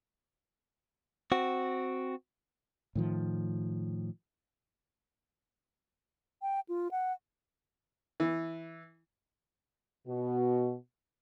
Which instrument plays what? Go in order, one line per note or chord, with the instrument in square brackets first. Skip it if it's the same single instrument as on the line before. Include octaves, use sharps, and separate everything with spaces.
[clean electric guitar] C4 F#4
[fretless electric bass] A2 D#3 F3
[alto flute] G5
F4
F#5
[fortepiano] E3
[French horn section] B2 F#4